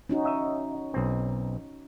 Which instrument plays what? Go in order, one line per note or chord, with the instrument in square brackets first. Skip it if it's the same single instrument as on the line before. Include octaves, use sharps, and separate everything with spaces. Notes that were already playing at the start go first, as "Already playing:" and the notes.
[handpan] C#4 D#4 F#4
[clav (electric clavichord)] D#5 E5
B1 C4